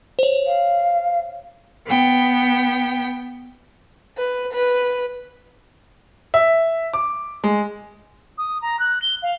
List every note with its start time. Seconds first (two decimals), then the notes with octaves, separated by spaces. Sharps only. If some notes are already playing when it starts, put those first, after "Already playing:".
0.19 C5 C#5
0.47 F5
1.87 B3 G5
4.17 B4
4.53 B4
6.34 E5
6.94 D6
7.44 G#3
8.38 D#6
8.61 A#5
8.79 F#6
9.02 G7
9.22 F5